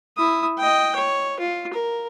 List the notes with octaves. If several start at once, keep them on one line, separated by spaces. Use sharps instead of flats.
E4 D#6
D#5 G5
C#5
F4
A#4